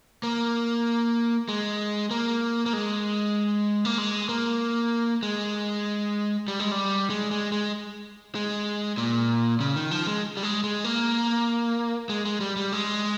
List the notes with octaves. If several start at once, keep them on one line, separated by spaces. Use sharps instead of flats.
A#3
G#3
A#3
A#3
G#3
A#3
G#3
A#3
G#3
G3
G#3
G3
G#3
G#3
G#3
G#3
A#2
C#3
D#3
F3
G#3
G3
G#3
G#3
A#3
G#3
G#3
G3
G3
G#3